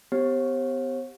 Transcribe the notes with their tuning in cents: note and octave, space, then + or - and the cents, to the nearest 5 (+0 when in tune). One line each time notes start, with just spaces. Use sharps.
B3 +40 G4 +0 C5 +45